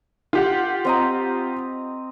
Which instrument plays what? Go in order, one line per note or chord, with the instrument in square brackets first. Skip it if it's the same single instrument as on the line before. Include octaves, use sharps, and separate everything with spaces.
[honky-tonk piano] F4 G4 F#5
[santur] C4 D#5 A#5